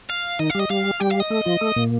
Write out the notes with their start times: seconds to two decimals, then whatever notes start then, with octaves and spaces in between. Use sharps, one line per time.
0.10 F5
0.39 D#3 D#4 D#5
0.50 F5
0.55 G3 G4 D#5
0.70 G3 G4 F5
1.00 G3 G4 G5
1.11 F5
1.20 D#5
1.30 A3 A4
1.45 F3 F4
1.61 A3 A4
1.76 A#2 A#3